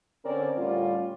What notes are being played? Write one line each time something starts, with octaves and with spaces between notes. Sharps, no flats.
D3 C4 C#4 A#4 C5 D5
A2 D3 G3 C#4 F4